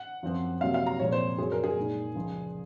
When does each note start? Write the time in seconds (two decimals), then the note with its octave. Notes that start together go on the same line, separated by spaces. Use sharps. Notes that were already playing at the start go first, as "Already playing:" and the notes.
Already playing: F#5
0.23 F#2 F3 C4
0.61 C3 F#3 A#3 F5
0.74 F5
0.87 A#5
0.99 A#2 F3 G#3 C4 C#5
1.12 C5
1.38 F#2 C#3 F#3 C#4 G#4
1.52 A#4
1.64 G#4
1.77 A#2 G#3 D#4
2.15 C#2 C#3 F3